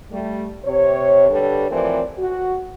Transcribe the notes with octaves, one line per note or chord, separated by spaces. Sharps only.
G3 A3
C3 C#5
D3 G3 A4 B4 C#5
A2 E3 F3 C4 A#4 D5
F#4